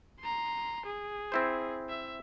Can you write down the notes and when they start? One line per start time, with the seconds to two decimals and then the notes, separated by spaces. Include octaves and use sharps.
0.20 A#5 C6
0.86 G#4
1.32 C4 E4 C5
1.89 E5